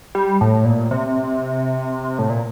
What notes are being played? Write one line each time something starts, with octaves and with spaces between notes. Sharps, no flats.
G3
A2
A#2
C3
A2
A#2